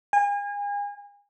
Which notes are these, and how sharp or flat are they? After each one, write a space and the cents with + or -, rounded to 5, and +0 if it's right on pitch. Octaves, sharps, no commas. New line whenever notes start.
G#5 -35